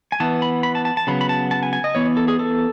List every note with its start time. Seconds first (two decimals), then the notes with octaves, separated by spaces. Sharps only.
0.12 G#5
0.20 E3 B3 A5
0.42 B5
0.63 B5
0.75 A5
0.85 A5
0.97 A5
1.07 C#3 F#3 B3 B5
1.21 B5
1.29 A5
1.51 A5
1.63 G#5
1.73 G#5
1.84 D#5
1.95 E3 B3 C#5
2.17 A4
2.28 G#4
2.39 A4